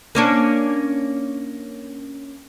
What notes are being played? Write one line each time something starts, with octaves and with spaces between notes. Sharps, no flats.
A#3 C#4 D4